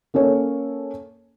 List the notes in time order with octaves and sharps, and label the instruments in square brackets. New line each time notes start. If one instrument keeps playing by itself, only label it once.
[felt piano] A#3 C#4 A4 C#5